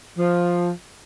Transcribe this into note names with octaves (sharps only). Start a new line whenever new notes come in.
F3